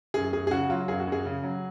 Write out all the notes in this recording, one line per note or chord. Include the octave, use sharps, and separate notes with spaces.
F#2 G#4
F#2 G#4
G#4
C#3 F#4
F#3 F4
F#2 G#4
F#4
F#2
G#4
C#3
F#3